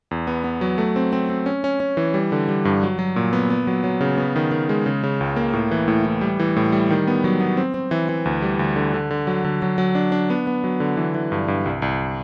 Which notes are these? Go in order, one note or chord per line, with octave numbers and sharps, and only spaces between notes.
E2
B3
B3
F#3
A3
C4
C4
C4
C#4
C#4
C#4
E3
G3
D3
G3
G2
F#3
F#3
A#2
B3
B3
F#3
F#3
C#3
B3
D#3
D#3
G#3
C#3
C#3
C#2
A#3
A2
E3
A2
E3
G3
E3
A2
G3
D#3
B3
F#3
B3
C4
C4
E3
E3
D2
G3
D2
D3
D3
D3
F#3
D3
F#3
F#3
D4
D4
B3
B3
F#3
D3
E3
E3
G2
G2
C2
C2